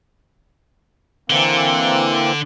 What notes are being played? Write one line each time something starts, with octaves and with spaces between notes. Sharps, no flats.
D3 E3 A#3 C4